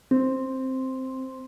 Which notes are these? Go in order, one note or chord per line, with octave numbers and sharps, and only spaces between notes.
C4